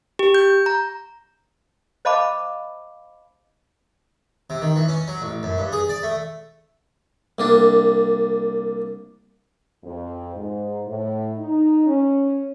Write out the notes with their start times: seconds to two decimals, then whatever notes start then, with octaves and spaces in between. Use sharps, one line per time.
0.19 G4
0.34 G6
0.66 A#5
2.05 C5 D#5 F5 A5 B5 D6
4.50 C3
4.62 D#3
4.76 E3
4.88 C#4
5.08 F#3
5.22 A1
5.43 F#2
5.58 G2
5.72 G#4
5.89 D5
6.03 A3
7.39 C2 A#3 D4
9.83 F2
10.35 G#2
10.86 A2
11.38 D#4
11.86 C#4